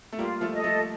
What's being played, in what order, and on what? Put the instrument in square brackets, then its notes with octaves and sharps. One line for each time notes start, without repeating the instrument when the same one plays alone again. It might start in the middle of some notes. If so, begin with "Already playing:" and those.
[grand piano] A3
[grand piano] G3 A#3 [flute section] F4
[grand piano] F3 A3
[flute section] A4 D#5
[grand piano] F3 A3